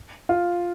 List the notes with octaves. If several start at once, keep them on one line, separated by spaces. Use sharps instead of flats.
F4